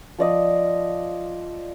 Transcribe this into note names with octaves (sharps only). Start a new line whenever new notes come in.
F3 D5 D#5